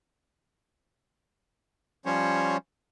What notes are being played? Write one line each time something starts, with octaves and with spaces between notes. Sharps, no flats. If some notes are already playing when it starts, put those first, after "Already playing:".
F3 G3 C#4 C5 C#5